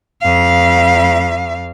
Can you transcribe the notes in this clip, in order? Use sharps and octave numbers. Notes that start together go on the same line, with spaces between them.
F2 F5